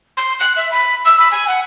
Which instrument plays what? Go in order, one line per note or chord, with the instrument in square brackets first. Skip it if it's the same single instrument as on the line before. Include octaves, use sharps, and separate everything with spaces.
[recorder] C6
F#6
E5
B5
E6
B5
G#5
F#5